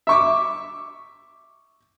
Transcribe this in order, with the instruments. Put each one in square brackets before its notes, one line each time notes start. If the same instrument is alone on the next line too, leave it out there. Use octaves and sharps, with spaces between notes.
[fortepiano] E5 C#6 D6